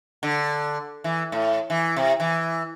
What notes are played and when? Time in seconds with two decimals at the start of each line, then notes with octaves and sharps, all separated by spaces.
0.23 D3
1.04 E3
1.32 A2
1.70 E3
1.96 C3
2.20 E3